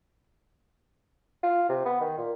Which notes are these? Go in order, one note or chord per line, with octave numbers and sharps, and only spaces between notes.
F4
C3
B3
D#3
A#2